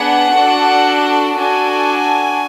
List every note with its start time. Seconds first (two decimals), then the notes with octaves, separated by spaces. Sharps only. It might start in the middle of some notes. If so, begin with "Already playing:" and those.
Already playing: B3 D4 G#4 F#5
0.35 D4 F#4 A4
1.36 D4 F#4 A4 G#5